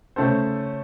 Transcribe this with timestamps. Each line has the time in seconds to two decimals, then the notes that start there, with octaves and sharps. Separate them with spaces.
0.16 C#3 A3 C#4 A4 C5